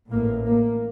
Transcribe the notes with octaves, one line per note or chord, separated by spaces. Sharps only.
A1 A2 A#3
A#3